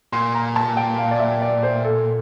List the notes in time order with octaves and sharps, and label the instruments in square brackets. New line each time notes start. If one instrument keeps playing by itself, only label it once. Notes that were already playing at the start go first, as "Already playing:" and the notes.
[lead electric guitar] A#2 [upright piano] C6
[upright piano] A#5
A5
G5
F5
D5
E5
D5
C5
A4